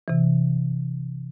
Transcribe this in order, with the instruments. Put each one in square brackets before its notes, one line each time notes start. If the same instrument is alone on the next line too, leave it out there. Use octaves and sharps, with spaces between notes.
[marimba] C3 E3